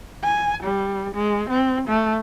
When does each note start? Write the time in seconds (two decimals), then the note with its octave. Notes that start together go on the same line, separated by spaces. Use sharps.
0.23 G#5
0.63 G3
1.15 G#3
1.50 C4
1.88 A3